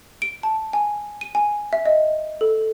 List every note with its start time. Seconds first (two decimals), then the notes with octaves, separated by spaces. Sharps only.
0.22 D7
0.43 A5
0.73 G#5
1.21 D#7
1.35 G#5
1.73 E5
1.86 D#5
2.41 A4